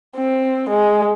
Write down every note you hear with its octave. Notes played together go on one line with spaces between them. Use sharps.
C4
G#3